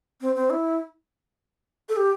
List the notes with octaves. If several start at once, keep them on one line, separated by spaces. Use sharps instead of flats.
C4
C4
E4
A4
G4